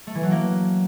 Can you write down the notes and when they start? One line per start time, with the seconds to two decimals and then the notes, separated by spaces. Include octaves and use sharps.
0.07 A3
0.15 E3
0.23 F#3
0.31 A#3